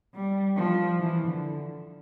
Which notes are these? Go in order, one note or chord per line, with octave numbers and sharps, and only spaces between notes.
G3
F3
E3
D3